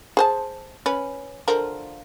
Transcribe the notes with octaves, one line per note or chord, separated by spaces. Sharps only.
G#4 C5 A5
C#4 B4
D3 F3 A#4